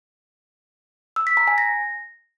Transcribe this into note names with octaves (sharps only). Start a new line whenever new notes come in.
E6
B6
A#5
G#5
A#6